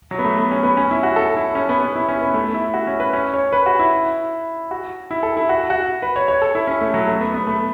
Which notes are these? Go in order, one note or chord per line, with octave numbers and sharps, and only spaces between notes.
F#3
B3
A3
B3
C#4
B3
C#4
E4
F#4
A4
E4
C#4
B3
B3
E4
C#4
B3
A3
E4
F#4
C#4
B4
C#4
C#5
B4
F#4
E4
F#4
E4
A4
E4
F#4
F#4
B4
C#5
C#5
A4
E4
C#4
A3
F#3
A3
B3
B3
A3